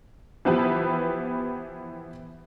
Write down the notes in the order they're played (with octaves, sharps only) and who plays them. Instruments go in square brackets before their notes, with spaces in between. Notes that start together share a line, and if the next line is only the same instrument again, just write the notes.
[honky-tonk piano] E3 F3 B3 E4 G4 B4